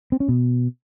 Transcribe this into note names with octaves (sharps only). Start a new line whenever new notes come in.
C4
C#4
B2